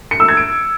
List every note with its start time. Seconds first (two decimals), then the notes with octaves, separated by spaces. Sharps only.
0.11 C#7
0.20 E6
0.28 G#6
0.37 D7